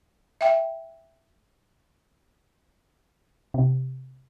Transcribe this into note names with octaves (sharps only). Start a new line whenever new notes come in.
E5 G5
C3